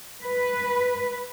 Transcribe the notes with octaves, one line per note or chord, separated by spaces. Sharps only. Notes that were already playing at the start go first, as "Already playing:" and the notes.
B4